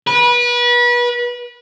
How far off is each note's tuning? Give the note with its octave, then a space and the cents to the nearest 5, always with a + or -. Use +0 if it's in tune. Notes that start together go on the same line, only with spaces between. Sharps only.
B4 -30